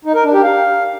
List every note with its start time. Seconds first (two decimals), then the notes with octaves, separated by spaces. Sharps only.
0.05 D#4
0.14 A#4
0.24 D4
0.33 G4
0.43 F5